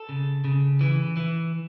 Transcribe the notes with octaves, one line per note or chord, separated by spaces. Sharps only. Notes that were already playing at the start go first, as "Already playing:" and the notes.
Already playing: A4
C#3
C#3
E3
E3